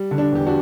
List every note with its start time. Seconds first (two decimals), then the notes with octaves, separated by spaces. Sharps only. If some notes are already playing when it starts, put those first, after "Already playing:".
Already playing: G3
0.11 D3
0.18 D4
0.32 E2 G4
0.46 D4 F#4